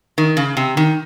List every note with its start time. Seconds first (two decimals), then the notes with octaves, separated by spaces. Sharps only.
0.18 D#3
0.37 C#3
0.57 C3
0.77 D#3